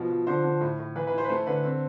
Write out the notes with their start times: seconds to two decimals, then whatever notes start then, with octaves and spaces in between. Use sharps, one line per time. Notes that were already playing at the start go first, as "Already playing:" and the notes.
Already playing: B2 F3
0.10 F3
0.27 D3 C5
0.44 D3
0.61 A2
0.79 A2
0.96 E3 B4
1.07 B4
1.12 E4
1.18 C5
1.24 B4
1.29 A3 C5
1.47 D3 B4
1.64 C4